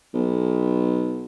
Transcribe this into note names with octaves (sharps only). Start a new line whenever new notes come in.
B1